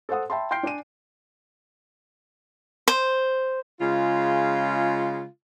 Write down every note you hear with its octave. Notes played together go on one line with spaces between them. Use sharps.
A4 C5 F#5 D#6
E5 G5 A5 B5 C6
G5 C6 F6 G6 C7 D7
D4 D5 G#5 D#7
C5
C#3 G#3 F4